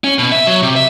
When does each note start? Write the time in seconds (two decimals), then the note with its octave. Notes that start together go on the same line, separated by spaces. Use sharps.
0.04 C#4
0.19 B2
0.32 E5
0.47 F#3
0.62 C3
0.76 E5